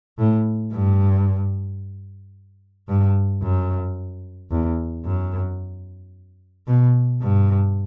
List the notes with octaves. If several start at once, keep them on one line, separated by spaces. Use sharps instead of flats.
A2
G2
G2
F#2
E2
F#2
B2
G2